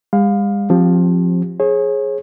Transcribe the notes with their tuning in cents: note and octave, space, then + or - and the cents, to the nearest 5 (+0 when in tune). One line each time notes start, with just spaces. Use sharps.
G#3 -45 F5 +20
F3 +15 C4 +20 G4 +0
G#4 +15 C#5 -35